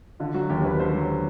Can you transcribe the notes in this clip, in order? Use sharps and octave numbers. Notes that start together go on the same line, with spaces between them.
D3 F4
F#3 F#4
D#2 G4
D#2 B4
D3 C5
F#3